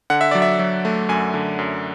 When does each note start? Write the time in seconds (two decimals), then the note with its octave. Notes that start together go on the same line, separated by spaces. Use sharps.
0.10 D3 F#5
0.21 E5
0.31 F#3 D5
0.42 E5
0.59 F#3
0.85 A3
1.09 F#2 G#5
1.34 D3
1.59 F#2